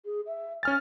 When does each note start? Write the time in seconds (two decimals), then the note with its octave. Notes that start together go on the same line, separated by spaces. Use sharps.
0.05 G#4
0.26 E5
0.63 C#4 G#5 F6 A6